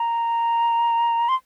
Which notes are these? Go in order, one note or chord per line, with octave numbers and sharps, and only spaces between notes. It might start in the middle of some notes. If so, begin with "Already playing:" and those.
Already playing: A#5
C6